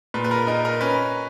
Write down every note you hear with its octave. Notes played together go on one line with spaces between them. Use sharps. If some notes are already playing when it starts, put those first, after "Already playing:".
A#2 B4
B4
A#4
D#4 A#4
A#4
C#4 B4